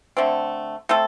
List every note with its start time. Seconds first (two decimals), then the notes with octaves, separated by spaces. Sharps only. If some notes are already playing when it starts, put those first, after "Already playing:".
0.17 D3 A3 C4
0.89 A3 C4 A4